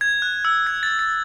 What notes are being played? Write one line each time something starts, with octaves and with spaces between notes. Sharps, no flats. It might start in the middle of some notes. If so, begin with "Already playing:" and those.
G#6
F#6
E6
G#6
A6
A6